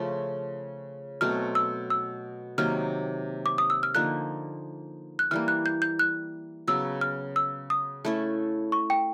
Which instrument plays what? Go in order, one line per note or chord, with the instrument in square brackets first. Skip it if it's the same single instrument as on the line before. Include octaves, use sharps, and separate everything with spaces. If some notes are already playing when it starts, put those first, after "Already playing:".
Already playing: [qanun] C#3 F3 A3 C#4
[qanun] B2 F#3 A3 C4 [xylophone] F6
[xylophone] E6
E6
[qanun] C3 D#3 F#3 A#3 [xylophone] F6
[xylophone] D6
D#6
E6
F6
[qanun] D3 F3 A#3 D#4 [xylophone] F#6
[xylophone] F#6
[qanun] E3 G3 A#3 [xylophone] F6
[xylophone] F#6
G6
G6
F#6
[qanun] C#3 F#3 B3 [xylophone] E6
[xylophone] F6
E6
D#6
[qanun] A3 C#4 E4 A4
[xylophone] C#6
G5